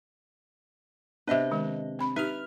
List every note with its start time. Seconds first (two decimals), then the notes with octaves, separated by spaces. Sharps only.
1.28 C3 B3 D4 B4 D#5 E5
1.51 D#3 G#3
1.99 C4 B5
2.16 D#4 G4 B4 E5 F6 F7